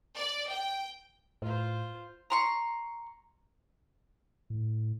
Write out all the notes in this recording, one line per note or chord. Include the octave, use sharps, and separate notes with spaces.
D5
G5
A2 F4 C5
A#5 C6 C#6
A2